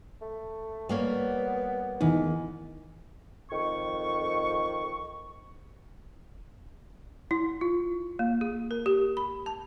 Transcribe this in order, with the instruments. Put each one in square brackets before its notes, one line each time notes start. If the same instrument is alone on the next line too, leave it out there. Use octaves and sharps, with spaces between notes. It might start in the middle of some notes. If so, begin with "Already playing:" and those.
[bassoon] A3
[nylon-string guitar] G3 A#3 C#5 [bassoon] B3
[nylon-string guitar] E2 [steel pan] D#3 E3 D#4
[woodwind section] F2 D#3 C#6
[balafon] E4
F4
A#3
G#4
A#4
G4
B5
A5